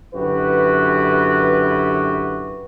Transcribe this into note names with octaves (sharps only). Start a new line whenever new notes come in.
F#2 D3 E4 F#4 G4 B4